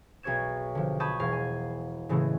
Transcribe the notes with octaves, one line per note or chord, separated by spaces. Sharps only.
B1 G#4 C#5 G#6 E7
D3 F3
A5 B5 C#6 D#6 G6 G#6
E1 F5 G#6 C7
G#5
A2 C#3 E3 F#3 G#3 A3